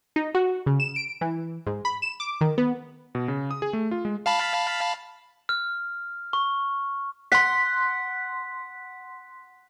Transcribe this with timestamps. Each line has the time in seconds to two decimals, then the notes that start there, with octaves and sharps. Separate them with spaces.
0.16 D#4
0.35 F#4
0.66 C#3
0.80 E7
0.96 D7
1.21 E3
1.67 G#2
1.85 B5
2.02 E7
2.20 D6
2.41 D#3
2.58 B3
3.15 B2
3.28 C#3
3.51 D#6
3.62 G#4
3.73 A3
3.91 F4
4.05 G#3
4.26 F5 A5 B5
5.49 F6
6.33 C#6
7.32 F#5 C6 B6